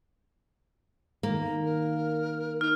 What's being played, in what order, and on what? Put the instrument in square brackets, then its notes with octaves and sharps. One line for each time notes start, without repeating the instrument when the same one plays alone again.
[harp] D#3 [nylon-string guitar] A#3
[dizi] A#4
[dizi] D#4 [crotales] F6